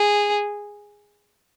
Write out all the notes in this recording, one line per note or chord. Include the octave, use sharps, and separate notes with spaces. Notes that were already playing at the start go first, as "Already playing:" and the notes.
Already playing: G#4